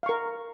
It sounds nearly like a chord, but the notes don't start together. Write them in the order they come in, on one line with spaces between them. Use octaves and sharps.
F5 C#6 A#4